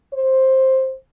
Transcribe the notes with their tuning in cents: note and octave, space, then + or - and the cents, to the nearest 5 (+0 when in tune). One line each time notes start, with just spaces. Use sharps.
C5 +10